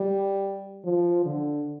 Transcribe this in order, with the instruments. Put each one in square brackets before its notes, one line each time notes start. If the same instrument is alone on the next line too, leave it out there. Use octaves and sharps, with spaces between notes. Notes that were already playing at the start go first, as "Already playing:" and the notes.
Already playing: [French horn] G3
F3
D3